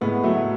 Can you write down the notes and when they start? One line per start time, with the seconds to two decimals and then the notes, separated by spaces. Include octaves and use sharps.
0.01 A2 G#3 B3
0.24 F#3 A3